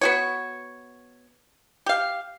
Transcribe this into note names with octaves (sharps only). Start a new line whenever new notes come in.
B3 F#4 C#5
G4 F5